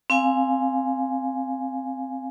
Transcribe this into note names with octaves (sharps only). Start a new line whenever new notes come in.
C4 F5 G#5